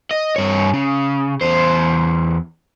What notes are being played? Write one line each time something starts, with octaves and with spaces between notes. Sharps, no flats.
D#5
G2 C#5
C#3
E2 C5